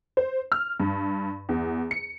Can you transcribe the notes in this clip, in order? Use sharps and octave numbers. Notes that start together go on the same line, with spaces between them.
C5
F6
G2
E2
C#7